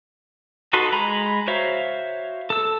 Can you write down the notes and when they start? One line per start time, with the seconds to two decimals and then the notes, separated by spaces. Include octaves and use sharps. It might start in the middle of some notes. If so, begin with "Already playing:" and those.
0.73 D#4 F#4 A4 B4 C6
0.92 G#3 A#5 B5
1.47 F#4 C5 C#5 E5 F5
2.50 A4 E6